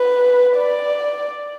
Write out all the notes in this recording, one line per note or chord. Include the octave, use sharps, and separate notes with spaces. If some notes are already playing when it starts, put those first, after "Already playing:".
Already playing: B4
D5